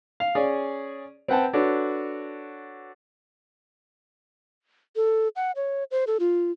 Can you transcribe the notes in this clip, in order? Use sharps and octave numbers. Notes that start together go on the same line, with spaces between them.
F5
C#4 G#4 D5
C4 B4 F#5 G5 A5
D4 F#4 A4 B4 C#5
A4
F#5
C#5
C5
A4
F4